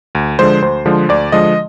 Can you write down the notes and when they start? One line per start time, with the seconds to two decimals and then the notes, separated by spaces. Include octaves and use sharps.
0.15 D2
0.39 D3 F3 G#3 C5
0.62 D2 C5
0.86 D3 F3 G#3
1.09 D2 D5
1.32 D3 F3 G#3 D#5